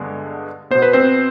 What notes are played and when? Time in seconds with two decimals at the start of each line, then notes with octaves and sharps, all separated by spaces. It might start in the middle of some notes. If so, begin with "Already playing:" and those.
Already playing: G2 D3 G#3 B3
0.71 B2 B3 C5
0.82 B4
0.93 C4 C5